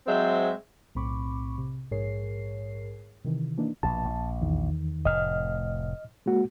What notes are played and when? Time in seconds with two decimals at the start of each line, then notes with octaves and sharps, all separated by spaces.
0.07 F#3 G#3 C4 C5 E5
0.95 B1 A2 C4 B5 C#6 D6
1.58 C3
1.91 A#1 G#2 G#4 A#4 C#5 C7
3.24 C3 D#3 E3
3.57 E3 A#3 D4 D#4
3.83 A#1 B2 A5
4.05 A#1
4.42 E2 D#3
5.05 F1 A2 D#5 F6
6.26 G#3 A#3 F#4